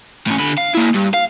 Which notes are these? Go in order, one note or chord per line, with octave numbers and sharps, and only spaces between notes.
A2 C#4
D3 B5
F5
A#3 E4
G2
F5